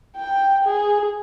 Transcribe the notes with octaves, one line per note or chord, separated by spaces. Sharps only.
G5
G#4